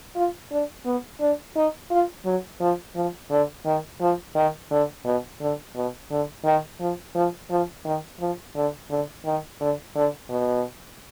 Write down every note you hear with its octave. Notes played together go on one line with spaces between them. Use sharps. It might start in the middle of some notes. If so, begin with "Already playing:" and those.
F4
D4
B3
D4
D#4
F4
F#3
F3
F3
D3
D#3
F3
D#3
D3
B2
D3
B2
D3
D#3
F3
F3
F3
D#3
F3
D3
D3
D#3
D3
D3
B2